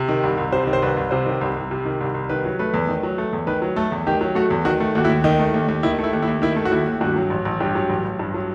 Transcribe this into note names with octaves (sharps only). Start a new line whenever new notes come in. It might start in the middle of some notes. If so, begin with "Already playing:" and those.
Already playing: C3
D#3
C2
C2
C3 C5
D#3
C5
C2 B4
C2
C3 C5
D#3
C2
C2
C3
D#3
C2
C2
D#3 B4
F#3
A3 B4
E2
D#3
F#3
A3
E2
D#3 B4
F#3
A3 A4
E2
D#3 G4
F#3
A3 F#4
E2
D#3 F#4
A3
D#2 F#4
E4
D#2
D#3 D#4
A3
D#2
D#2
D#3 E4
A3
E4
D#2
E4
D#2
D#3 E4
A3
F#4
D#2 E4
D#2
G2 F#4
F#3
A1
A1
G2 G4
F#3
A1
A1
G2
F#3